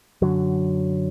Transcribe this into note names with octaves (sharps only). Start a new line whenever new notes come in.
F#2 D3 F#3